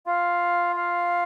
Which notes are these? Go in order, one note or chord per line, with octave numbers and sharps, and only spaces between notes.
F4 F5
F5